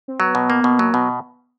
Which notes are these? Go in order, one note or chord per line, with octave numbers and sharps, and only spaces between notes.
C4
F#3 B3
B2
A#3
B2
F#3 A#3
B2 B3